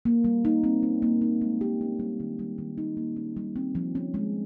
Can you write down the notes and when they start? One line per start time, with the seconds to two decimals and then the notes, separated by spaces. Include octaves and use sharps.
0.05 A#3
0.24 G3
0.45 D#4
0.64 C4
0.83 C#4
1.02 A#3
1.22 D#4
1.42 G#3
1.61 G4
1.81 C#4
2.00 G3
2.20 D#3
2.39 G3
2.58 D#3
2.78 D#4
2.97 A#3
3.16 C#4
3.37 G3
3.56 C4
3.75 F3
3.95 C#4
4.14 G#3